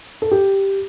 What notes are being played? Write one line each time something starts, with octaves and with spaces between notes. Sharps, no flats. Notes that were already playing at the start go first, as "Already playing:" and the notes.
A4
G4